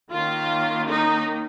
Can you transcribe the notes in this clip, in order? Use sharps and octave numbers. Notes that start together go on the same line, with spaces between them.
D#3 A#3 C#4 F4
D#4